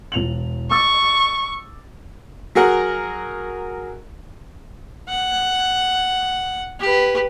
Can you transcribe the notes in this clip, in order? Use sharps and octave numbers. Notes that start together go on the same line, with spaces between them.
E1 F7 F#7
C#6 D6 E6 A6
F#3 G#4 A#4 F#5
F#5
G4 B4